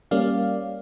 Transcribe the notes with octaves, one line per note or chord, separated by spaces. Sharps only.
G3 A#3 C#4 D5 F5